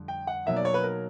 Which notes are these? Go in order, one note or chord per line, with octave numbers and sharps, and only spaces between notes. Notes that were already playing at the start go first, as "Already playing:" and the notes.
Already playing: F2 D3 G3
G5
F#5
B2 F#3 A#3 D#4 E5
D5
C#5
B4
A#4